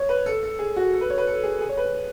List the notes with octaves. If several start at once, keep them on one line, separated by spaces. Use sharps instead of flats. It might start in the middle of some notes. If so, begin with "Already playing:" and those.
Already playing: C#5
B4
A4
A4
G#4
F#4
A4
B4
C#5
B4
A4
G#4
G#4
C#5
B4